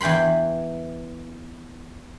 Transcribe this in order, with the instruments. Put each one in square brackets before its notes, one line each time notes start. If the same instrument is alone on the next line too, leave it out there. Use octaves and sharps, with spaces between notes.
[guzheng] E2 E3 G5 B5 C6